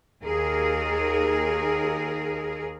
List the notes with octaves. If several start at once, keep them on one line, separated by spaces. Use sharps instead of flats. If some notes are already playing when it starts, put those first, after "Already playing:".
D#2 G#4 A#4